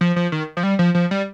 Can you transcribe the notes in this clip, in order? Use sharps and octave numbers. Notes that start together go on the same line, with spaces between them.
F3
F3
D#3
F3
G3
F3
F3
G3